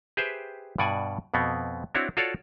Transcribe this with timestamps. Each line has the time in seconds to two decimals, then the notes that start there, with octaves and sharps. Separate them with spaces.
0.17 G4 G#4 B4 C5 E5 G5
0.78 G2 B2 D5 F#5 G#5
1.34 F2 B2 B3 C4
1.95 C4 D4 E4 F#4 C#5
2.17 F4 F#4 A4 C#5 D5 F5